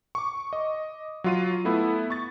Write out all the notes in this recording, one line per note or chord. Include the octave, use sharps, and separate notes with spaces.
C#6 D6
D#5
F#3 F4 D#7
A3 B3 E4
C#6 A6